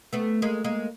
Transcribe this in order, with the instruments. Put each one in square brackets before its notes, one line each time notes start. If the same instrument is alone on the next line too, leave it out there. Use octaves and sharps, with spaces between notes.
[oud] A3 B3
G#3 A#3
G#3 A#3